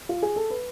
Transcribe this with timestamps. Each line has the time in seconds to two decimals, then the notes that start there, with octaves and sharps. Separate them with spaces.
0.09 F4
0.22 G#4
0.36 A4
0.50 B4